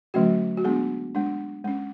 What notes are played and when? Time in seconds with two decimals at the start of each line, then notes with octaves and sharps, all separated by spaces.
0.14 D3 F#3 A3 C#4 F#4
0.57 F#4
0.64 G#3 B3 D4 G#4
1.15 G#3 D4
1.65 G#3 C#4